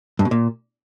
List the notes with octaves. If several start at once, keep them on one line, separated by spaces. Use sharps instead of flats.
G2
B2
A#2